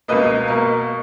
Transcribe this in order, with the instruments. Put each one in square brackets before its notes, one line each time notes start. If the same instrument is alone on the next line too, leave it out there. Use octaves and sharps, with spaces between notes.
[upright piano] C#2 B2 A#3 B4 D#5
B2 A#3 A#4